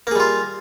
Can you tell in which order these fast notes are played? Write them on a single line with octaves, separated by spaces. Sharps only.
A#3 G#4 G3 F4